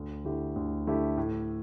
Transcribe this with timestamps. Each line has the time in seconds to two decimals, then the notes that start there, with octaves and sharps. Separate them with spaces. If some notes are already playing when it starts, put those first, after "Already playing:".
Already playing: D2
0.25 D3 A3 E4 G4
0.56 D2
0.87 D3 A3 E4 G4
1.17 A2